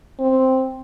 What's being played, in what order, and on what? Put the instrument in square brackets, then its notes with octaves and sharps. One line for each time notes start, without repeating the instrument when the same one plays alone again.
[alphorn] C4